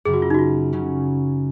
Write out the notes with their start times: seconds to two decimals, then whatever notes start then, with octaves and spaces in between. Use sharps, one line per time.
0.05 F#2 C#3 F#3 G#4
0.14 F#4
0.22 F4
0.30 D#4
0.34 F#4
0.39 F4
0.73 C#3 F#3 C#4